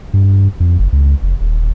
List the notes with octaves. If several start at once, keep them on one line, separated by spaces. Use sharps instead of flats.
G2
F2
F#1
C#2
F1
D#1